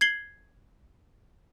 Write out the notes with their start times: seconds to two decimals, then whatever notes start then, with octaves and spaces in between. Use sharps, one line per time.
0.01 G#6 C7 F#7 G7